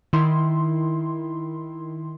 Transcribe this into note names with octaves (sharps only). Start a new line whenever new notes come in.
D#3 E4 C6